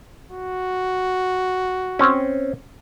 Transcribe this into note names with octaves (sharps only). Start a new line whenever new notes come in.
F#4
C4 C#4